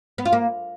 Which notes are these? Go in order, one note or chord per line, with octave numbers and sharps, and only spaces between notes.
B3
F4
A#3